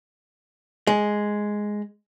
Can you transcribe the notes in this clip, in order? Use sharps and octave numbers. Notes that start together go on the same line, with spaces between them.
G#3